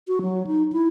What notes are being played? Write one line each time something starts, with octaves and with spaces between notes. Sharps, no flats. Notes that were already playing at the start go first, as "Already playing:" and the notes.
F#4
F#3
D#4
E4